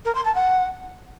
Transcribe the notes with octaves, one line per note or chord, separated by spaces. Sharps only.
A#4
C6
A5
F#5